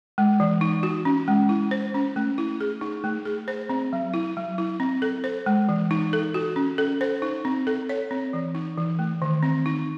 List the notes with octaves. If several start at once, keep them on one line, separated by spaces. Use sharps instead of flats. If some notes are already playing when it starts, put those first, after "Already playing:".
G#3
E3
D#4
F#4
C#4
G#3
E4
C5
C#4
A3
E4
G#4
D#4
A3
G#4
C5
C4
F#3
E4
F#3
E4
C4
A4
C5
G#3
E3
D#4
A4
F#4
C#4
A4
C5
D#4
C4
A4
C#5
C4
E3
D#4
E3
A3
D#3
C4
D#4